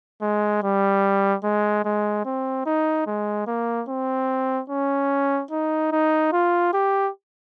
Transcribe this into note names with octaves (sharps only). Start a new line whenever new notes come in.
G#3
G3
G#3
G#3
C4
D#4
G#3
A#3
C4
C#4
D#4
D#4
F4
G4